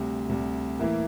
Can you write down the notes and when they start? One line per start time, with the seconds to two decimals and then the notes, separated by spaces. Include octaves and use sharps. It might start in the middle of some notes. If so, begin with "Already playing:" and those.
Already playing: D2 C3 G3
0.29 D2 C3 G3
0.79 A2 E3 A#3 E4